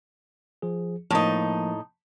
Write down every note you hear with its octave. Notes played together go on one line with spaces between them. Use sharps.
F3 G#4
A2 F3 A#3 D#4